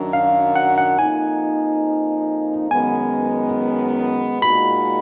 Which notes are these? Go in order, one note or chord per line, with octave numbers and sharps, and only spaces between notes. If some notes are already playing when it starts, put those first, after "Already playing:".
Already playing: F#2 D#3 F#3 D4
F5
F#5
F#5
F2 F3 A#3 D#4 G#5
F#2 D#3 G#3 B3 G#5
A#2 G#3 D#4 F#4 B5